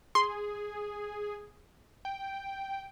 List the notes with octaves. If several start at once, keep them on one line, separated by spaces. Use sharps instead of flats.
G#4 C6
G5